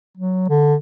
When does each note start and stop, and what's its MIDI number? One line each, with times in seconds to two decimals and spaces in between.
0.17 0.45 54
0.49 0.75 50